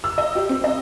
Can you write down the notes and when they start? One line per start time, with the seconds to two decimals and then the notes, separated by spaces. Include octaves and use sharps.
0.04 E6
0.18 D#5
0.35 G4
0.49 C4
0.64 D#5